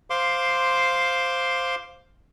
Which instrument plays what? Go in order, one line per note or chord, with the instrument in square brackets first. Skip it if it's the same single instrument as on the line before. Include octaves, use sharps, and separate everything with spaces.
[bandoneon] C5 F5 C6 D6